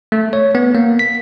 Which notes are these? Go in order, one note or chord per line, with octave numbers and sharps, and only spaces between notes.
A3
C#5
B3
A#3
B6